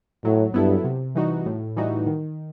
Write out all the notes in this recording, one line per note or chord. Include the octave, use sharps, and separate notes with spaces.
A2 F#3
G2 B3 E4 A4
C3
E3 G3 D#4 F#4
A2
E3 G3 D#4 F#4
D#3